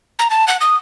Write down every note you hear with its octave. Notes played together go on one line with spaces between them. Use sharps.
A#5
A5
F#5
D#6